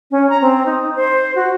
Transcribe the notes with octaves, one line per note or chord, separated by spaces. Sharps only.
C#4
A#5
C4
D#4
C5
F#4